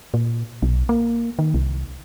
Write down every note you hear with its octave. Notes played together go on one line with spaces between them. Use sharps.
A#2
B1
A#3
D#3
C2